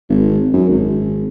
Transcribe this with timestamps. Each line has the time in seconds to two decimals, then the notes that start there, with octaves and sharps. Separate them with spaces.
0.10 G#1
0.53 F#2
0.69 G#1